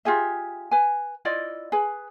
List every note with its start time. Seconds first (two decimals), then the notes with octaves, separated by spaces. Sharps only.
0.05 F4 G4 G#4 E5
0.71 B4 G#5
1.25 E4 F4 D5 D#5
1.72 G#4 B4